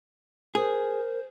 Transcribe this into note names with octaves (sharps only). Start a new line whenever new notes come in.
G#4 A#4 C5